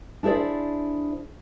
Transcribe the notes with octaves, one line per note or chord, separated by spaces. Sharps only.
D4 E4 G#4 C5 D5